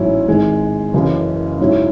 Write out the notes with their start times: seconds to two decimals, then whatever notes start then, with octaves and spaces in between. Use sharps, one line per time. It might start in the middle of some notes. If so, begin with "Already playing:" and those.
Already playing: A1 G#2 F#3 C#4 E4
0.28 G#1 G#2 G#3
0.93 F#1 F#2 C#3 E3
1.59 G#2 F#3 C#4 E4